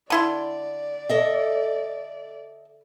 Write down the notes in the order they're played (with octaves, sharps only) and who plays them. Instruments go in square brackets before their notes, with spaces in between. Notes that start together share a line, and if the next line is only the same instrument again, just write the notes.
[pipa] D3 E4 C6 [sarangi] D5
[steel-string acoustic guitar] A4 D#5 E5